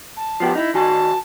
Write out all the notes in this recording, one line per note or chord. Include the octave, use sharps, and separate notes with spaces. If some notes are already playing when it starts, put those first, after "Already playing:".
A5
F3 B3 G4
D#4 E4
D#3 F#4 G#5 A5